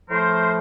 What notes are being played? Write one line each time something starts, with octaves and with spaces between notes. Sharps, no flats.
A2 F3 A3 A#4 C5